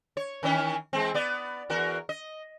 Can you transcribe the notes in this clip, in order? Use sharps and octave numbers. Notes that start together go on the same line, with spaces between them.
C#5
D#3 E3 C#4
E3 G#3 C4
B3 D5
E2 F#4 A#4
D#5